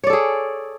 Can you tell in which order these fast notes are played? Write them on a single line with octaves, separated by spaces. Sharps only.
C#5 D5 A4 G#4